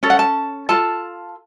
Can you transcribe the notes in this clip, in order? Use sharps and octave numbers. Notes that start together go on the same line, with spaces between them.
C#4 A4
F#5
A5
F4 A4 A5